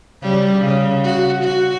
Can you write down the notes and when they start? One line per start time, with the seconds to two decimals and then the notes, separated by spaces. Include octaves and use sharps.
0.22 C#3 G3
0.60 C#3
1.03 F#4
1.42 F#4